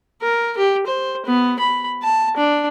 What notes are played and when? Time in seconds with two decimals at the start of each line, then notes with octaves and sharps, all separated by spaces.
0.22 A#4
0.57 G4
0.86 C5
1.26 B3
1.59 B5
2.03 A5
2.37 D4